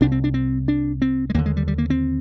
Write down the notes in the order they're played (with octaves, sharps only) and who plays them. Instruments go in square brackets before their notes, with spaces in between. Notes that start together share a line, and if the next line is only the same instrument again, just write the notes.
[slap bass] C2 C3 D4
C4
D4
C4
D4
C4
G#3
D#2 A#3
D3
G#3
G3
G3
A#3
C4